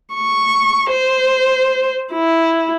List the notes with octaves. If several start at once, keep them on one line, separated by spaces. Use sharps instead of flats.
C#6
C5
E4